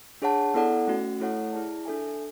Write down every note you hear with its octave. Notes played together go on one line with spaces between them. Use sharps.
D4 G#4 C#5 F#5 A5
B3 E4 A4 D5 F#5
A3 C#4 F#4
A3 E4 A4 C#5 F#5
E4 G#4 D5 A5
D4 A4 E5 G#5